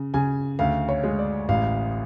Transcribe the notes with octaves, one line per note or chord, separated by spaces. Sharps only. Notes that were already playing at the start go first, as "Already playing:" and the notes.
Already playing: C#3
C#3 G#5
D2 F5
C#5
G#3
D5
A1 F5